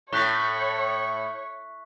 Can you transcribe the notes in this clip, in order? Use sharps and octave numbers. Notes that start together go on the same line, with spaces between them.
A2 C#5 C#6 F#6 B6